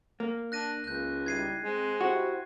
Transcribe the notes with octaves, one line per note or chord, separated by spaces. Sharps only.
A#3
D4 F#6 A#6 D#7
C#2 F#6 G6
G3 D#4 E4 G#6 C7 D#7
G#3 C4
E4 F#4 G4 C5